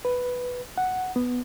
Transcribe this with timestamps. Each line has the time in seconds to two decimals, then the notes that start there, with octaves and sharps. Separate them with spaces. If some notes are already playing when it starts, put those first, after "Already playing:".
0.05 B4
0.78 F#5
1.16 B3